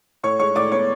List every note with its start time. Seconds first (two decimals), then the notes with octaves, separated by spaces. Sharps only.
0.23 A2 C#5 C#6
0.39 G#3 C#5 C#6
0.55 A2 D5 D6
0.72 B3 C#5 C#6